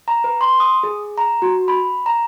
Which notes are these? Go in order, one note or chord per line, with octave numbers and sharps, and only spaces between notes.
A#5
B4
C6
D#6
G#4
A#5
F#4
B5
A#5